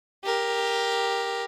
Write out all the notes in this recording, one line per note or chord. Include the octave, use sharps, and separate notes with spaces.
G4 A#4